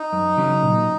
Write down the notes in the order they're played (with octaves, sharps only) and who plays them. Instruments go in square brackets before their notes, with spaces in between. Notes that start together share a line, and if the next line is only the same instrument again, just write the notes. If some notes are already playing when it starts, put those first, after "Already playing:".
Already playing: [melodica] D#4
[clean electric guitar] F#2
C#3 F#3 C#4
A#2